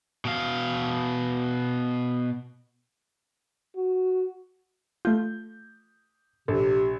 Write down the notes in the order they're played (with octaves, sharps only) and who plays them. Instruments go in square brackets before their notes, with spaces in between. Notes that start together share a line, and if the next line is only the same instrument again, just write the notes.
[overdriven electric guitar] B2 F5
[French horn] F#4
[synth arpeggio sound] A3 F4 [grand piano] G6
[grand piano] A#1 [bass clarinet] C3 [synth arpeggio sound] A4